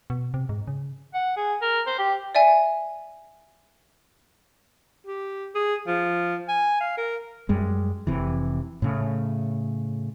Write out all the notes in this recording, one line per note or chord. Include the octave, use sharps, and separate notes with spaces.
B2
C3
G#2
C#3
F#5
G#4
A#4
C5
G4
D5 E5 G#5
G4
G#4
F3
G#5
F5
A#4
F#2 G3 G#3
F1 C3 E3
A2 C#3 A3